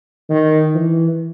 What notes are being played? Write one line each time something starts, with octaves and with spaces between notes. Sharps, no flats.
D#3
E3